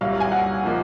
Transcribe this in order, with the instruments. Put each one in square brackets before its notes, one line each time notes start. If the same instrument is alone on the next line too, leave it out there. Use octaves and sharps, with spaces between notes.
[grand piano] C2 A#2 F#3 [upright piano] F5
[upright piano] G#5
F#5
[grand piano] A#2 F3 A#3 D#4